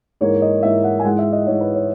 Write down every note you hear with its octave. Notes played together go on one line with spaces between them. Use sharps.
G#2 E3 A#3 C#5
D#5
G#2 E3 A#3 E5
F#5
G#5
G#2 E3 G#3 F#5
E5
D#5
G#2 E3 G#3 C#5
B4
C#5